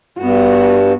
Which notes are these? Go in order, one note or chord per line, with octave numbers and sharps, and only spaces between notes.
G2 B3 F#4